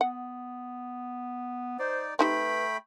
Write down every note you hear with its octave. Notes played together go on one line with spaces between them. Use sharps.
B3 F#5
D#4 C5 D5
A3 C4 D#4 G4 B4 G5 B5